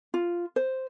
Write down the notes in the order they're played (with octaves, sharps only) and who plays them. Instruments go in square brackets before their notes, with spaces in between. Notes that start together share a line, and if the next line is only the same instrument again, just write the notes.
[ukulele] F4
C5